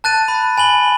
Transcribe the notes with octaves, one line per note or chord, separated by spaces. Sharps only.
A5 F#6 A6 D#7
B5
G#5 B5 F#7 G7